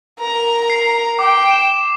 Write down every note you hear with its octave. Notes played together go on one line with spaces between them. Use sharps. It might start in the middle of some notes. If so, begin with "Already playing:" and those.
A#4 A#5
C7
G5 D6
E7